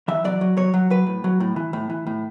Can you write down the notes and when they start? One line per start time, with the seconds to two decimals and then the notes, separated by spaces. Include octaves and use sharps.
0.08 E3 E5
0.24 F#3 D5
0.41 F#3
0.57 F#3 C#5
0.74 F#3
0.90 F#3 B4
1.06 A2
1.24 F#3
1.40 A2
1.56 E3
1.73 A2
1.90 E3
2.07 A2